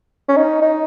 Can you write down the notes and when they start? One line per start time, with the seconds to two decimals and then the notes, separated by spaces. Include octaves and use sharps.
0.29 C#4
0.36 D#4
0.62 D#4